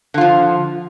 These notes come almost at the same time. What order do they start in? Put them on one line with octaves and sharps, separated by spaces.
D3 F4 F3